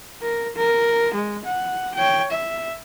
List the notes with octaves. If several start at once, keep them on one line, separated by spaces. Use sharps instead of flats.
A#4
A#4
G#3
F#5
C#5 G5
E5